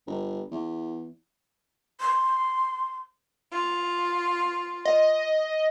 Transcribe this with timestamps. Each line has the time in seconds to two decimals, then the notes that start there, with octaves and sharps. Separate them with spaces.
0.07 G1
0.52 E2
2.00 C6
3.52 F4
4.85 D#5